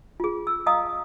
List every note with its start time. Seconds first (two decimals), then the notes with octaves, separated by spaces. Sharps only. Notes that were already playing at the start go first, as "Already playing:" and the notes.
0.20 F4 G#4
0.47 E6
0.66 D#5 F5 A#5 D#6